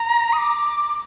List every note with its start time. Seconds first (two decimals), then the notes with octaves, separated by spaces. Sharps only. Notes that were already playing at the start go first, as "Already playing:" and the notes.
Already playing: A#5
0.33 D#6
0.38 D6